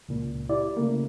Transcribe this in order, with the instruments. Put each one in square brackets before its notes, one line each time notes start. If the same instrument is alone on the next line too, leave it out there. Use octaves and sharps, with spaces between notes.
[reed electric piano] C#2 A#2
E4 G4 D5
C#3 A3 A#3